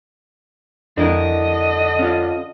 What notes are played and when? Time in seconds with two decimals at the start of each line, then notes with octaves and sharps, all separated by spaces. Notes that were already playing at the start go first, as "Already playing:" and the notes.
0.98 F2 D3 D4 E4 A#4 D#5
1.99 C#4 F4